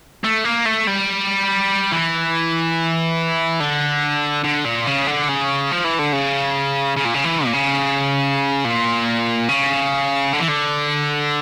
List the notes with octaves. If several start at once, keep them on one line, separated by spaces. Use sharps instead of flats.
A3
A#3
A3
G3
E3
D3
D3
A#2
C#3
D3
C#3
F3
E3
D3
C#3
C#3
A#2
C#3
E3
A#2
C#3
A#2
C#3
D3
E3
D3